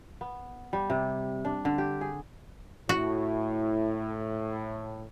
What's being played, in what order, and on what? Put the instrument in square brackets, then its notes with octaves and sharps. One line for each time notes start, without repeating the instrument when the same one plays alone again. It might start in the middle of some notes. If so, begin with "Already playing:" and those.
[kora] B3
G3
C3
D4
D3
G4
G#4
[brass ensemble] A2 [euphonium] E4 [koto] F#4